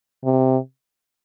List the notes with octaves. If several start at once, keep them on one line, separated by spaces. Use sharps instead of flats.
C3